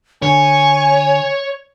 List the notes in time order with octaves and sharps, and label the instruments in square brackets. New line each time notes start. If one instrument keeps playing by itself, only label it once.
[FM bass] D3 [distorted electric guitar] C#5 [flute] G#5